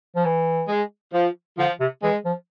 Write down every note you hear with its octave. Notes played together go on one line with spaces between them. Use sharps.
F3
E3
G#3
F3
D3 F3
C3
E3 G#3
F3